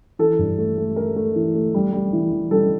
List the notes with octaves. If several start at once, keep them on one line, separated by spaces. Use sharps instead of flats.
E3 A4
G2
A3
A3
A3 A#4
A3
E3
A3
G3
G3
E3
E3
G3 A4